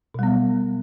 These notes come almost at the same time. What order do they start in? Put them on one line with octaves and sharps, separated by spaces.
B2 G3 B3 F#3